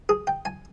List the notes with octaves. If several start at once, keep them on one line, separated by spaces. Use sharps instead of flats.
G#4
G5
G#5